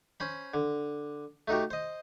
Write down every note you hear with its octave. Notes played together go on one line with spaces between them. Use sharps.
C#4 C5 B5
D3
A3 D#4 F#4 G4
C5 D#5